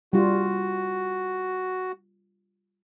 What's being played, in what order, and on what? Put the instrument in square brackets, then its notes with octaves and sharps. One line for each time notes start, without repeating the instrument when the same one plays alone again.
[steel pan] G3 F4 [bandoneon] F#4